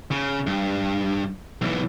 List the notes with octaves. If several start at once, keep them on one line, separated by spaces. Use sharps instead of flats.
C#3
G2
B1 E3